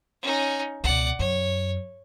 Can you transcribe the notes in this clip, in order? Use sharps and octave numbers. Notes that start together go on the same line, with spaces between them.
C#4 D#4
C#2 B2 D5 F#5
F#2 C#5